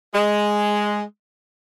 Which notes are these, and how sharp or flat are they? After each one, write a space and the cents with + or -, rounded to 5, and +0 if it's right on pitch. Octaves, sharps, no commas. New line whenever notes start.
G#3 +0